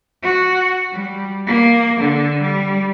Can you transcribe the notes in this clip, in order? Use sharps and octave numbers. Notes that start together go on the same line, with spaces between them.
F#4
G3
A#3
D3
G3